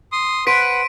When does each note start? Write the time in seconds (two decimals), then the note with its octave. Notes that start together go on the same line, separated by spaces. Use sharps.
0.12 C6 D#6
0.47 B4 C5 F#5 B6 D7 D#7